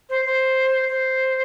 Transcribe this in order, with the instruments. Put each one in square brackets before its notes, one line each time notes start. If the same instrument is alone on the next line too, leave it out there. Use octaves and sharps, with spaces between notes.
[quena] C5
C5
C5